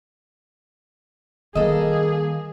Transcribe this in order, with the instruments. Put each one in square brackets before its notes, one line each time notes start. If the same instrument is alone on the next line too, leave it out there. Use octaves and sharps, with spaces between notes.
[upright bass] D#3 G3 [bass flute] A#3 [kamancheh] G#4 [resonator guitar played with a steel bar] A4 D#5